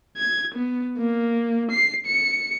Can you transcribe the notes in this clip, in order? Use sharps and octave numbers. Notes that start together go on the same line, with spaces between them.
G#6
B3
A#3
C7
C#7